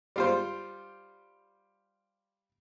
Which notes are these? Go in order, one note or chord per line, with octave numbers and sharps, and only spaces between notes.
G3 F4 C5